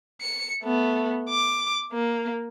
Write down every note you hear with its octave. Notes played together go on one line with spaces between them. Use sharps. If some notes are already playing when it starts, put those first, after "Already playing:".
C#7
A3 B3
D6
A#3